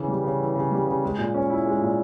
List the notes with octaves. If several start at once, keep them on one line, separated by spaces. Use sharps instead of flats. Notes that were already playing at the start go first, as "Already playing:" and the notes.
Already playing: C#3 E3
G3
C#3
E3
C#3
G3
C#3
G#3
A#2
C#4
E4
G#3
A#2